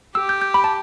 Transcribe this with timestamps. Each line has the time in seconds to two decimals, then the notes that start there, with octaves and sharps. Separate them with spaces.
0.15 G4 E6
0.29 G6
0.42 G6
0.54 B5
0.64 A5